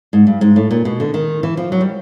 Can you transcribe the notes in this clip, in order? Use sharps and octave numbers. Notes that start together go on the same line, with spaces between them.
G#2
G2
G#2
A2
A#2
B2
D3
D#3
E3
F3
F#3
G3